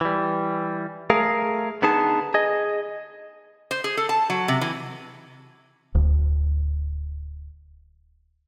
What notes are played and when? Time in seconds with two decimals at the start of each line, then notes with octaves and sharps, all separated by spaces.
0.01 E3 G3
1.10 A3 G#4 A#4 F5
1.82 D3 B3 D#4 G#4 A5
2.34 G#4 D#5
3.71 C5
3.84 G#4
3.97 A4
4.09 A5
4.30 F#3
4.48 C3
4.61 E3
5.95 D1 D2